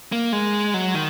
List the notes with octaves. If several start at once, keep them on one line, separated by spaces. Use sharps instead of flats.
A#3
G#3
F#3
D#3